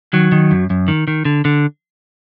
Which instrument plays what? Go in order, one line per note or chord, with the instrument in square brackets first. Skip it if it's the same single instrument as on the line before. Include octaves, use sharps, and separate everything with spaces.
[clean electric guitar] D#3 F#3
D#3
F#2
F#2
D#3
D#3
D3
D3